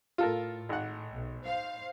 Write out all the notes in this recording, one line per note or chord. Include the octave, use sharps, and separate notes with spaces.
A2 F4 A4 A#4
G#1 F#5
B1
C5 F5